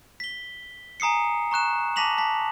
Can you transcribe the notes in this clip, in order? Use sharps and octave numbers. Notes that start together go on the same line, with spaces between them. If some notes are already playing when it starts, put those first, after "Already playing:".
B6 G7
G#5 A#5 D#6 C7 C#7
A#5 C#6 F#6 E7
A5 D6 A#6 B6 F7 F#7
A5 B6